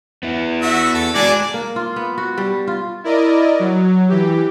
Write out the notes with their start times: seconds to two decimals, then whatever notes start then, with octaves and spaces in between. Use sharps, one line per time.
0.23 B3 E4
0.62 F#4 E5
0.94 A4
1.15 G#3 D4 F#4 G#4 D5 G#5
1.54 A#3
1.76 F4
1.96 B3
2.18 F#4
2.38 G3
2.67 F4
3.04 E4 A#4 D5 D#5
3.59 F#3
4.09 E3 G4